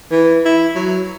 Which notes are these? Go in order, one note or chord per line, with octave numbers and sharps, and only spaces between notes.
E3
E4
F#3